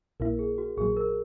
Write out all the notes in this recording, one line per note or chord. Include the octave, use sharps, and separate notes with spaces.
A#1 A#2 A#3 E4 A#4
G#4
F#4
A#1 A#2 F#3 G#4
A#4